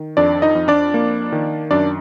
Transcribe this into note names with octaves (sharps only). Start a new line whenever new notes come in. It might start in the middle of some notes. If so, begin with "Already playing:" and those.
Already playing: D#3
F2 D4 D5
D#4 D#5
F2
D4 D5
A#3
D#3
F#2 D4 D5